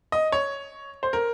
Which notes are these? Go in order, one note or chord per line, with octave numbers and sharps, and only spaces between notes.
D#5
C#5
C5
A#4